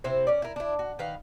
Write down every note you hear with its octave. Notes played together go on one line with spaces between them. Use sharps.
C3 C4 E4 C5
C#4 D5
E4 A#4
D4 E4
F#4
D#3 B4 F5